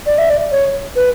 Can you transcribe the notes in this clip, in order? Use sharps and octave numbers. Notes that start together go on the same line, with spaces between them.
D5
E5
D5
C#5
B4